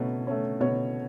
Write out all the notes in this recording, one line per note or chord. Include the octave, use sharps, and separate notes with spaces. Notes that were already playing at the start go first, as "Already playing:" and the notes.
Already playing: B2 A3 C#4
A3 C#4
B2 C#5